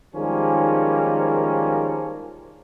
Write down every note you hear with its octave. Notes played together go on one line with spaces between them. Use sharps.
D#3 F3 G3 G#3 A#3 C#4